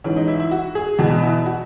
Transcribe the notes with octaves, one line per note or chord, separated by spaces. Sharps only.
G#2 E3 C#4
D#4
E4
E4
F#4
G#4
E2 B2 F#4
E4
F#4